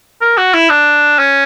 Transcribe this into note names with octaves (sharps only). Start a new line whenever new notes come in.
A#4
F#4
E4
D4
C#4